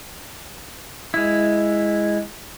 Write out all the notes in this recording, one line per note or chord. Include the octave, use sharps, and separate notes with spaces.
G#3 E4